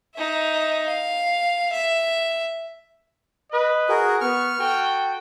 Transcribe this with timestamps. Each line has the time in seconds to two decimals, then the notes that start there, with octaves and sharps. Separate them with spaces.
0.15 D#4 E5
0.87 F5
1.72 E5
3.52 B4 D#5
3.89 F#4 G#4 A#4
4.21 B3 C#6 F6
4.59 F#4 A4 G5